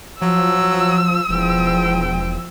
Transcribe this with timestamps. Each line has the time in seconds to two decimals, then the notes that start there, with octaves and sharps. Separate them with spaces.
0.22 F3 F#3 E6
1.29 E1 E2 F3 G5